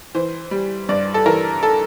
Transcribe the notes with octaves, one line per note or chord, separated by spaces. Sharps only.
E3 C5
G3
G2 D5
A4
E3 A#4
A4